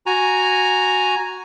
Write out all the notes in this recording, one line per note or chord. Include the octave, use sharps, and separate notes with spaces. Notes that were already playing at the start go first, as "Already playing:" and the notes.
F#4 G#5 A#5